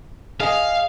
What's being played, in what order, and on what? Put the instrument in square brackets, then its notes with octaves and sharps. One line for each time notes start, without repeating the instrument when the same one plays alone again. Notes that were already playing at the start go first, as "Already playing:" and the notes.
[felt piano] G#4 D#5 G#5 [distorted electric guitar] F5